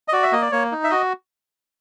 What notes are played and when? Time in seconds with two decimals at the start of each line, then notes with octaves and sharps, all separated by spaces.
0.08 D#5
0.13 F#4 D5
0.23 E5
0.32 A#3 D#5
0.42 D5
0.52 A#3 C#5
0.72 D#4
0.84 E5
0.90 F#4 D#5